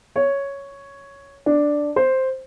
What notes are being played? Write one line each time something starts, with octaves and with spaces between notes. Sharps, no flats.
C#5
D4
C5